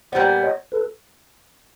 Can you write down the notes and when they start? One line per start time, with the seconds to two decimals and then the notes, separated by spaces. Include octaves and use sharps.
0.12 A#2 G3 B3 C5 D5
0.42 C#5 D#5
0.72 A4 B4